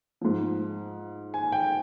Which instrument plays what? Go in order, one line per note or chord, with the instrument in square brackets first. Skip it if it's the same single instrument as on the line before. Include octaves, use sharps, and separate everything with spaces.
[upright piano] G#2 F3
G#5
G5